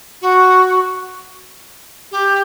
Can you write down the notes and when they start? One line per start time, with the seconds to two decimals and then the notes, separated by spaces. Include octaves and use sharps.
0.21 F#4
2.11 G4